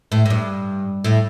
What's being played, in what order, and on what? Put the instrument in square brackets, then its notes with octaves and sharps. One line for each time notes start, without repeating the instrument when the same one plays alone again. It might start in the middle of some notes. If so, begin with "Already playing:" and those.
[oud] A2
A2
G2
A2